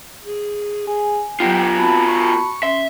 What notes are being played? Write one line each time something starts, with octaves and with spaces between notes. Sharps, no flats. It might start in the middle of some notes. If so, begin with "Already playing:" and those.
G#4
G#4 G#5
F#3 B3 F4 G4 G5
C4 F#4 A5 B5
C#6
C#4 E5 C6